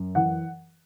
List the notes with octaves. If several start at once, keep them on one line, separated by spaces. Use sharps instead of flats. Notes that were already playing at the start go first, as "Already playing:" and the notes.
Already playing: F#2
E3 F#5